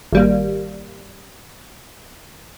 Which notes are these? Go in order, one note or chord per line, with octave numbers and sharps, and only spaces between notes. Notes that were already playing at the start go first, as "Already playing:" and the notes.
G#1 G3 A#3